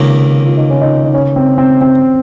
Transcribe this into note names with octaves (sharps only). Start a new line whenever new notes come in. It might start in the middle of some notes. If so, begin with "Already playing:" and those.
Already playing: C#2 C3 D#3 A#3 C#4
F4
D#4
C#4
D#4
D#4
C#4
C4
C4
C4